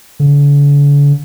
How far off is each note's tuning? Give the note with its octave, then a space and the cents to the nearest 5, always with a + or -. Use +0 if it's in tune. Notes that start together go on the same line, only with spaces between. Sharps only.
D3 -45